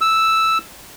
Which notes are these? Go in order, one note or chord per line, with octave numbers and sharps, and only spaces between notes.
E6